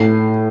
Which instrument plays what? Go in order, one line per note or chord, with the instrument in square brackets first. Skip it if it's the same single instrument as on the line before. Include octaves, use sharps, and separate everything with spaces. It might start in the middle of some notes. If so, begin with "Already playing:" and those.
Already playing: [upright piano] A2 C7